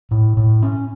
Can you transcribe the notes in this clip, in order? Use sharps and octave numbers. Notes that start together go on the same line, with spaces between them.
A2
A2
C#4